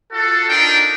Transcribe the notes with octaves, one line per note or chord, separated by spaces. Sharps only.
F4 F#4 A4
D4 D#4 F4 A#4 G5